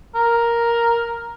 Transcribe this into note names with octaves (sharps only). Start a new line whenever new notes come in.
A#4